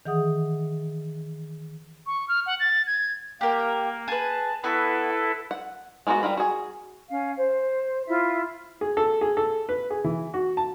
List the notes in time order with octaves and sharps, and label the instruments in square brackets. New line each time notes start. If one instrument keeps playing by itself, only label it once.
[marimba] D#3 E3 G#4 F#5 D#6
[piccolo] C#6
F6
F#5
A6
G#6
[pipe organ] A#3 [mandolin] G4 A#4
[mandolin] G#4 B4 [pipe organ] A5
[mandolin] B3 F#4 B5 [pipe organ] E4 A4 B4
[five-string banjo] F#5
G#3 A#3 B3 D4 F#4
G3 F4 A#4 B5
F#4 G#4
[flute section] C#4 F5
C5
E4 F4 E5
[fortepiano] G#4
A4
G#4
A4
B4
G#4
E3
F#4
A5